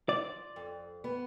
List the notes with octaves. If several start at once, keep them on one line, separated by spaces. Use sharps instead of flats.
F4 D5
F2
B3